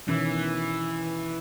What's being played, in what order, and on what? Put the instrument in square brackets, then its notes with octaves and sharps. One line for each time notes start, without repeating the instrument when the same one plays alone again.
[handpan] B2 D#3 C#4 [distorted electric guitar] E3